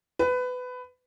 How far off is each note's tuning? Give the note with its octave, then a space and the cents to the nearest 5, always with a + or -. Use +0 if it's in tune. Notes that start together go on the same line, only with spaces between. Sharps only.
B4 +20